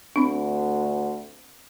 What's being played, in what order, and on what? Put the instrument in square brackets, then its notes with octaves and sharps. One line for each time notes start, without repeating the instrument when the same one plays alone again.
[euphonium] D2 [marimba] C4 D4